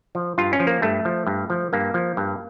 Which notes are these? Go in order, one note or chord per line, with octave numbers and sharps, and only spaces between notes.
F3
G2 F4
C#4
F3
A#3
G2 A3
F3
G2
F3
G2 A#3
F3
G2